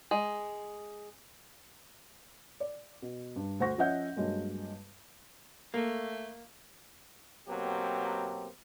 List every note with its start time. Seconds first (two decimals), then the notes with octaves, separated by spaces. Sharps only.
0.11 G#3
2.60 D5
3.02 B2
3.36 G2
3.60 D2 C5 F#5 C#6 A#6
3.78 F3 C#4 D#5 E5 F#5 G6
4.16 G2 F#3 G#3 A#3
5.74 A3 A#3
7.49 B2 F#3 A#3 C4 G4